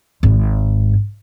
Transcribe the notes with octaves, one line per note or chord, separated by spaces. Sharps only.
G#1 G#2